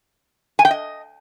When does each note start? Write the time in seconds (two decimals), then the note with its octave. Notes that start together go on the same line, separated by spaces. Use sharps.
0.59 G#5
0.65 G5
0.71 D#5